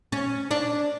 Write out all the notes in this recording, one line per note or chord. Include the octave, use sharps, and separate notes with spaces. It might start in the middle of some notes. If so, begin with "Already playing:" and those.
C#4
D4